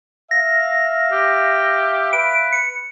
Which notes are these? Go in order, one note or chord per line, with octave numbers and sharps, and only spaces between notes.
E5 F5 A#6
G4
B4 D7
C#7